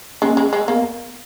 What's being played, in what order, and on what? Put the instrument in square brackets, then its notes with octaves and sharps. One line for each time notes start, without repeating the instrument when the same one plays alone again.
[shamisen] G#3 [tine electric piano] A#3 C#4
[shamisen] G#3
G#3
[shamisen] A#3 [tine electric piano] B3